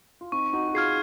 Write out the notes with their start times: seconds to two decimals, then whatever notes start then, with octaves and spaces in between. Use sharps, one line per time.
0.21 F4
0.32 C4 D#4 C#6
0.53 D#4 F#4
0.69 F#4
0.74 F4 G#4 F6 G#6 C7